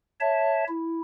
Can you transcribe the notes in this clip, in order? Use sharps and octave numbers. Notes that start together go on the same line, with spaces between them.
C#5 E5 A5
E4